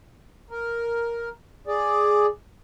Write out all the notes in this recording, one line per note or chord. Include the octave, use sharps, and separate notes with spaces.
A#4
G#4 D5